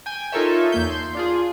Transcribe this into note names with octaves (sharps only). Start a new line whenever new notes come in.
G5 G#5
D#4 F4 A4 A#4 C#5 E5
E2 A#3 G6
C6
D4 F4 G#4